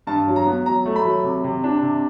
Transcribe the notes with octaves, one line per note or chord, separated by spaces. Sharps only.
G2 A5
F#3
A#5
B3
F#3 A#5
A3
B5
F#3
C3
C3
D4
C3